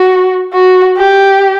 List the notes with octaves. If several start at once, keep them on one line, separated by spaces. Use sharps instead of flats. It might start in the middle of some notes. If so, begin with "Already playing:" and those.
Already playing: F#4
F#4
G4